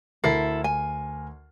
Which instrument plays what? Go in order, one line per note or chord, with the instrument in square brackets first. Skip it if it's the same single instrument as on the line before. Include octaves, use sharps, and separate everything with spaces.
[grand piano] D2 A#4 C7 [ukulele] E4 A4
[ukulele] G#5